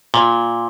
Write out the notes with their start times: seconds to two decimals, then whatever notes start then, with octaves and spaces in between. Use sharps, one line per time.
0.14 A#2